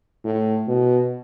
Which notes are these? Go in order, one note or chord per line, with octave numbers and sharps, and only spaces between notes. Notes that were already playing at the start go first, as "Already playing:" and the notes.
A2
B2